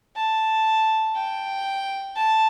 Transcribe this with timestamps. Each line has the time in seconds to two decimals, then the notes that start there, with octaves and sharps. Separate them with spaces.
0.16 A5
1.16 G5
2.16 A5